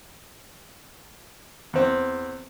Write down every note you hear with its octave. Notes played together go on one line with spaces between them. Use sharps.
E2 C4